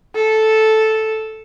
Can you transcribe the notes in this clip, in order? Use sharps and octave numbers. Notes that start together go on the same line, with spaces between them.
A4